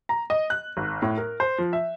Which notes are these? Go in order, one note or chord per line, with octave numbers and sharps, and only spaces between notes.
A#5
D#5
F#6
G#1
A2
A#4
C5
F3
E5